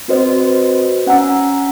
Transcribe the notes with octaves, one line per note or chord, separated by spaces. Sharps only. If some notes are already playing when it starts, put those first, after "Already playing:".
C4 F#4 B4 C5 D#5
C#4 F#5 G#5 A#5 E6 B6